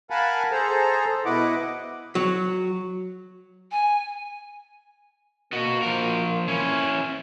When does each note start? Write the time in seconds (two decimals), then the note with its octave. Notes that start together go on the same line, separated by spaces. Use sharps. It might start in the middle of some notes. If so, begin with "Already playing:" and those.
0.10 A#4 F5 F#5 G#5 A5 B5
0.51 G#4 A4 C5 A#5
1.25 B2 E4 B4 D#5 F#5 D6
2.15 F#3
3.72 G#5
5.53 A#3 F#4 D#5
5.82 F3 A#4
6.48 C#4 E4